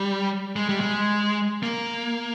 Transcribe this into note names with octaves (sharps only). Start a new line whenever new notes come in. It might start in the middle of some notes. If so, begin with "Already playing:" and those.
Already playing: G3
G#3
G3
G#3
A#3